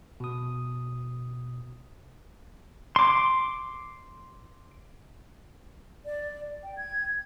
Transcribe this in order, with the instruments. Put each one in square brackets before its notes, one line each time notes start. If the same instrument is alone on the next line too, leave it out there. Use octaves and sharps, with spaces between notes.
[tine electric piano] B2 D#6
[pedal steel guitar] C6 D6
[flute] D5
G5
G#6